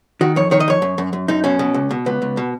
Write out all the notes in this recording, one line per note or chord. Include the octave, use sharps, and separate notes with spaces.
D#3 F#4
F2 C#5
D#3 C#5
D#5
F2 C#5
F#2
F#2
F#2
F#2 D#4
B2 C#4
B2
C#2
B2
C#2 B3
C#2
B2